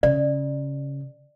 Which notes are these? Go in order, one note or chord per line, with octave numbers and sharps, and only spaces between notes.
C#3 D5